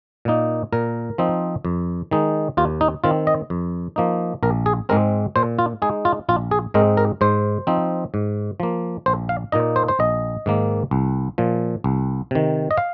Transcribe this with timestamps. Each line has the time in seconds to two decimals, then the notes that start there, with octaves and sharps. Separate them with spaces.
0.25 A#2 A#3 D#4
0.72 A#2 A#4
1.18 F3 C4 D#4
1.65 F2
2.11 D#3 G#3 D#4
2.57 D#2 F4
2.81 D#4
3.04 D#3 C4 F4
3.27 D#5
3.50 F2
3.96 F3 A#3 D#4
4.43 A#1 A#4
4.66 G#4
4.89 G#2 G#3 C4 A#4
5.36 A#2 C5
5.59 F4
5.82 G#3 D#4 G#4
6.05 F4
6.29 A#1 F4
6.51 G#4
6.74 G#2 G#3 C4 D#4 A#4
6.97 A#4
7.21 G#2 C5
7.67 F3 C4 D#4
8.14 G#2
8.60 F3 A#3
9.06 A#1 C5
9.29 F5
9.52 A#2 A#3 D#4 D#5
9.76 C5
9.88 C5
9.99 A#1 D#5
10.46 G#2 D#3 A#3
10.91 C2
11.38 A#2 F3
11.84 C2
12.31 C3 D#3
12.71 D#5
12.77 F5